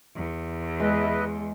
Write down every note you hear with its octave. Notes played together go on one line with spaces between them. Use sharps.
E2
G#3 B4 D#5 E5